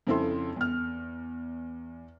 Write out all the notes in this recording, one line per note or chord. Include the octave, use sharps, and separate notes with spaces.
F2 C#3 C4 E4 A4 C6
E2 F6